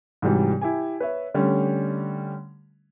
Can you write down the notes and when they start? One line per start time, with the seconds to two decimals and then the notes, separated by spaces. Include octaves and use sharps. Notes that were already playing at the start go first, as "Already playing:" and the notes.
0.22 G#2 C3 E3 F#3 G3
0.61 E4 G4 G#5
1.00 B4 C#5 E5
1.34 D3 G3 A3 C#4